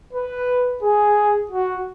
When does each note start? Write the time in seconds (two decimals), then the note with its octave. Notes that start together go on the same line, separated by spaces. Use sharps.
0.13 B4
0.82 G#4
1.51 F#4